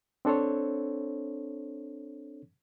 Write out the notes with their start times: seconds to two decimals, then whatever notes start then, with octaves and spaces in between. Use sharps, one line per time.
0.25 C4 D4 A4 C5 C#5